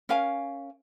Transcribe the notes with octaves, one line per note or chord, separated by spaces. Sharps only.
C#4 A#4 F5 G#5